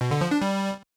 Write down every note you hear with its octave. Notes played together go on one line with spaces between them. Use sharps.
B2
D3
F3
D4
G3